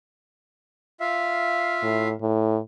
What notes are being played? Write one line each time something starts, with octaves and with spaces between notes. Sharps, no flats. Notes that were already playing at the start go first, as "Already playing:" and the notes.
F4 E5 F5
A2
A2